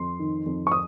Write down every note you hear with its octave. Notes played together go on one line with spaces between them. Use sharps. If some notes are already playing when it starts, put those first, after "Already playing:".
Already playing: F2 C6
D#3
F2
C#6
D#6